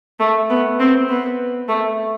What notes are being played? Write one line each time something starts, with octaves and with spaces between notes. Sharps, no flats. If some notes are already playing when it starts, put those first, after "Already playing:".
A3
B3
C4
B3
A3